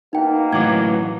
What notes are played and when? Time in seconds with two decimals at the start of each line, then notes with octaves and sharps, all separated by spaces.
0.13 B2 A#3 D#4 G5
0.53 A2 E3 F#3 D6 G#6